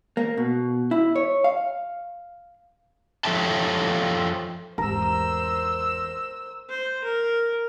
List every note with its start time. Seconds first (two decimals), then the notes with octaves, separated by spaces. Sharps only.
0.17 A#3
0.37 B2
0.91 E4
1.16 C#5
1.44 F5
3.25 F3 A4 C#5 E5 G5 A5
4.78 G#1 E2 A#4 C5 E6
6.70 C5
7.04 A#4